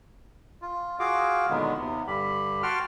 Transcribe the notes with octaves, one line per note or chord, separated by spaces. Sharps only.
F4
F4 F#4 G#4 F5 D6
A#2 D3 D#3 F#3 G#3 B3
D#2 C3 B3
G2 D3 G3 G4 B5
F#4 F#5 G5 A5 C6 F6